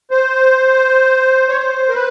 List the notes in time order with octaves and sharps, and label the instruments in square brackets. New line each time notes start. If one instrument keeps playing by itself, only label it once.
[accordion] C5
C#5
C5
A#4
B4